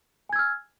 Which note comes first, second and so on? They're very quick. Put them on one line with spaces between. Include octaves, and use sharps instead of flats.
G#5 G#6 E6 F6